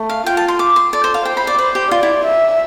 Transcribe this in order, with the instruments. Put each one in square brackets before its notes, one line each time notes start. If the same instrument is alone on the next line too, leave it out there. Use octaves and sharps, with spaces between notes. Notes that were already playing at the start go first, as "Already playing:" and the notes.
Already playing: [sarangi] A3
[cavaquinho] F5
[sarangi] F4 [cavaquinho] G5
[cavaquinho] A5
C6
D6
C6
[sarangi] A4 [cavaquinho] D5
[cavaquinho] C5
F5
[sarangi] C5 [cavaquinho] G5
[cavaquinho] B5
D5
[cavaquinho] B4 [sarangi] C5
[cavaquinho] G4
[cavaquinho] F4 [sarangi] D5
[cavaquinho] E4
[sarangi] E5